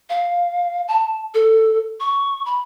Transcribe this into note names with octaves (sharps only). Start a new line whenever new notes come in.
F5
A5
A4
C#6
B5